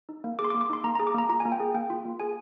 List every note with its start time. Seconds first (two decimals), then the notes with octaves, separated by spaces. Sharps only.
0.09 D#4
0.24 A#3
0.39 G#4 D6
0.45 C6
0.50 D6
0.55 A#3
0.61 D6
0.70 D#4 C6
0.84 A#3 A#5
0.95 A#5
1.00 G#4
1.07 D6
1.15 A#3 A#5
1.29 F4 A#5
1.40 G#5
1.45 A#3
1.52 G5
1.60 G#4
1.75 A#3 G5
1.90 F4
2.05 A#3
2.20 G#4 G#5